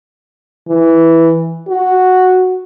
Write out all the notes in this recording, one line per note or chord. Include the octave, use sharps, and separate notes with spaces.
E3
F#4